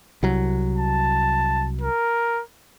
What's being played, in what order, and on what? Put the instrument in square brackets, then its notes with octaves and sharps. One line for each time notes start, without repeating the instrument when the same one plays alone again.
[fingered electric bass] C2 F#3
[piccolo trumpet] A5
A#4